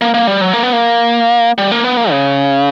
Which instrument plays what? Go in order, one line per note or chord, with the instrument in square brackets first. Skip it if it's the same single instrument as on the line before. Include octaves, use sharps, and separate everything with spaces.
[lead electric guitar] A#3
A#3
G3
F#3
A#3
B3
A#3
G3
A#3
B3
A#3
C#3